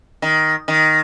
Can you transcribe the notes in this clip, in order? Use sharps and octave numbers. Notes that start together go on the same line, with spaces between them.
D#3
D#3